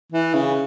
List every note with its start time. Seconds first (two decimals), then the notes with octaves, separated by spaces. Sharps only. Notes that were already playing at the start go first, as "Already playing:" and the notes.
0.12 E3
0.34 C#3